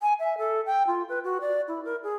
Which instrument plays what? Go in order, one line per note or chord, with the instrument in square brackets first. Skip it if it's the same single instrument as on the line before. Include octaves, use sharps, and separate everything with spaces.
[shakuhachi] G#5
E5
A4
G5
F4
B4
F#4
D5
E4
A#4
G#4